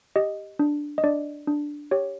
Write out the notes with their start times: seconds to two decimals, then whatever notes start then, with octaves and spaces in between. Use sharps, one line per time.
0.16 G4 D#5
0.59 D4
0.98 D#5
1.04 D4 D5
1.47 D4
1.91 G4 C#5